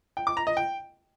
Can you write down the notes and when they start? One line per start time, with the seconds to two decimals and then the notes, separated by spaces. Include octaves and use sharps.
0.17 G5
0.27 D6
0.37 A#5
0.47 D#5
0.57 G5